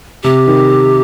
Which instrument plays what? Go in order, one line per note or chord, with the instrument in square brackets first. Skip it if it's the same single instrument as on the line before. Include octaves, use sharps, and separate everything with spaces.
[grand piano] C3 [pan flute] G4
[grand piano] D#3